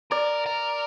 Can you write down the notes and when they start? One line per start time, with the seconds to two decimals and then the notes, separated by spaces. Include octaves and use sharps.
0.11 A#4 D5
0.46 A#4